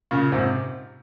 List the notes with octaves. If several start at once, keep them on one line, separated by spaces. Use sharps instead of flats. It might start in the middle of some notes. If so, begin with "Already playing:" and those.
A#2 C#3
G#2 C3